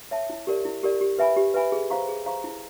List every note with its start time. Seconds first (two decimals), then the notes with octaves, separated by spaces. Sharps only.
0.11 C#5 E5 A5
0.30 E4
0.47 G4 A#4 D5
0.65 E4
0.83 G4 A#4 D5
1.01 G4
1.19 B4 E5 G#5 B5
1.36 G4
1.54 B4 E5 G#5 B5
1.72 G#4
1.90 C5 F5 A#5 C#6
2.08 G#4
2.26 C5 F5 A#5 C#6
2.44 E4